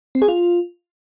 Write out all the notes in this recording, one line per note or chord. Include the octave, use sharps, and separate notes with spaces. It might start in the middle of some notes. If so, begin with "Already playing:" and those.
C4
G#4
F4